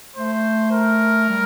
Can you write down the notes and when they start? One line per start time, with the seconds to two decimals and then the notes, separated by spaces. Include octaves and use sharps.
0.16 A3 C5
0.72 A#4
1.29 G3